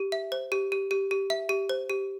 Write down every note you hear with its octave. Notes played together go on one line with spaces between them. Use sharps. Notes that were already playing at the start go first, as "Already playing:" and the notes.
Already playing: G4
E5
C5
G4
G4
G4
G4
E5
G4
C5
G4